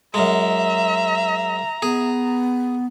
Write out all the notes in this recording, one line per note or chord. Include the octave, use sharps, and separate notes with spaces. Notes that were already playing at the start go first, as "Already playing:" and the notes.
F#2 G#3 E5 A#5
B3 G#4